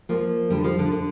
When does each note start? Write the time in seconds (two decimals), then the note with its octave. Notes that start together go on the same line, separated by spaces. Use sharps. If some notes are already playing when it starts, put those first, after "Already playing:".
0.09 F3 A#3
0.50 D3 G3
0.64 F3
0.79 D3
0.92 D3